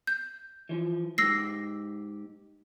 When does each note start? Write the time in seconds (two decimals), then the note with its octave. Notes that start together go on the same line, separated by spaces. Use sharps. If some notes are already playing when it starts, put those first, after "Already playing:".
0.07 G6
0.69 E3 F3
1.18 G#2 G4 E6 A#6 C7